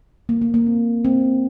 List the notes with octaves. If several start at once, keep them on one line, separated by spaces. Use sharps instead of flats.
A#3
A#3
A#3
C4
C4